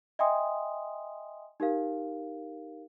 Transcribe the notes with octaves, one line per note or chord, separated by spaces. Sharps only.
D#5 E5 G5 G#5 C6 D#6
D#4 G4 A#4 F5